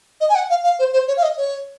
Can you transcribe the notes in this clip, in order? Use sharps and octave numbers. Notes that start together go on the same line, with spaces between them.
D#5
G#5
F#5
F5
F5
C5
C5
C#5
F5
D#5
C#5